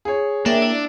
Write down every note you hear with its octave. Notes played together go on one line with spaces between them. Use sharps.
G#4 C#5
A#3 D4 A#4 E5 G5
E4 D5